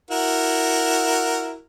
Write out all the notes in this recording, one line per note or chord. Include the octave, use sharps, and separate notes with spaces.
E4 F#4 A#4